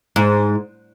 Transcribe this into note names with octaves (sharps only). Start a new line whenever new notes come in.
G#2